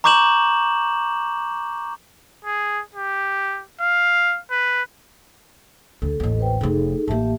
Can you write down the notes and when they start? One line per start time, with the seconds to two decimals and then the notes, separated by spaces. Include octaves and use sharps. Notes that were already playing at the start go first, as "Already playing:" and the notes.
0.04 A#5 C#6 D6 G6 E7 F#7
2.45 G#4
2.95 G4
3.81 F5
4.51 B4
6.02 D2 A4
6.20 A1 D#2 A4 D#5
6.39 B4 C5 G5
6.61 F1 A3 D#4 G#4 A4
7.08 A1 A#3 G4 E5 A5